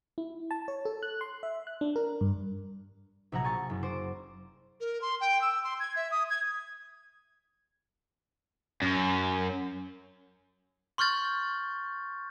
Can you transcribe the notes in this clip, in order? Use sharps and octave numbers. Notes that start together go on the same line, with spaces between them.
E4
A5
C#5
A4
F#6
C6
E5
F#6
D4
A#4
G2
A#1 C3 F#3 F#5 A#5 G#6
G#5 C#6 A6
F#1
F#4 C5 D6
A#4
C6
G5
E6
C6
G#6
E5
D#6
G#6
F#2
C6 C#6 F6 G6 A6